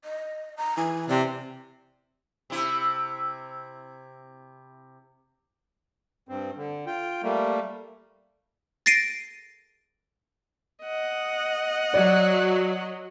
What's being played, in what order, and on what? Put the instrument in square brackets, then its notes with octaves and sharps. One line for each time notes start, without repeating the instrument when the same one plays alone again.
[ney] D#5
A#5
[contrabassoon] E3 [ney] G#5
[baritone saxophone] C3 [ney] D5
[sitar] C3 E4
[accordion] G2 C4
D3
F4 G5
G3 A3 A#3
[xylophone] A6 A#6 C7 D7 D#7
[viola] D#5 F#5
[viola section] F#3 [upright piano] D5